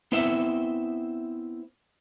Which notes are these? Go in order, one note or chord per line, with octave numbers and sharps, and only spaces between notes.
B3 C4 E4 C5 E5